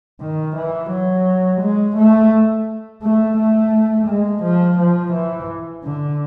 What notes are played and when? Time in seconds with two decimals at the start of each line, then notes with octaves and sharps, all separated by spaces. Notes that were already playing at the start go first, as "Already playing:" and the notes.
0.21 D#3
0.56 E3
0.91 F#3
1.61 G#3
1.96 A3
3.02 A3
3.37 A3
4.07 G#3
4.43 F3
4.78 F3
5.13 E3
5.83 D3